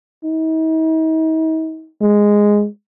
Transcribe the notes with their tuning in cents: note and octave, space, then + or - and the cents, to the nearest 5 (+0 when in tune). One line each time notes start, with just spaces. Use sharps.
D#4 +45
G#3 -5